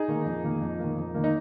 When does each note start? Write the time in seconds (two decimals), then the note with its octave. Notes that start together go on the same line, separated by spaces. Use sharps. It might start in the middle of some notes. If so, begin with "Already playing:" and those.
Already playing: D#4 G#4
0.08 D#3 A#3
0.26 F2
0.44 D#3 A#3
0.61 F2
0.79 D#3 A#3
0.97 F2
1.14 D#3 A#3
1.24 D#4